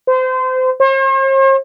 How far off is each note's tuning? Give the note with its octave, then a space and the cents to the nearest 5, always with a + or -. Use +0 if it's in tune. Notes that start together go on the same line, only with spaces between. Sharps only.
C5 -30
C5 +45